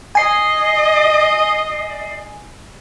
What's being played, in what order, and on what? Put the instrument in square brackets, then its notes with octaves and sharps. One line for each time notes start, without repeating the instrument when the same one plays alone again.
[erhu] D#5 [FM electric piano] G#5 C7